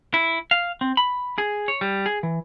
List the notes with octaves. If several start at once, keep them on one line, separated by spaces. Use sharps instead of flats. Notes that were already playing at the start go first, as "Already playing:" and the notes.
E4
F5
C4
B5
G#4
C#5
G3
G#4
E3